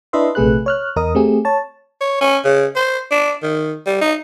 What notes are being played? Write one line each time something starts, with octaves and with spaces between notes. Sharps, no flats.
D4 E4 B4 D#5 E5 C6
A#1 C3 A3 G#4 B4 F#6
C#5 F6 F#6
E2 A#4 D#5 D#6
A3 C4 G4 G#4
C#5 A5
C#5
C#4
C#3
C5
D4
D#3
G3
D#4